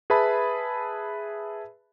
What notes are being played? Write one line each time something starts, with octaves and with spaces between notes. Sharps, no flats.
G#4 B4 E5 A5 B5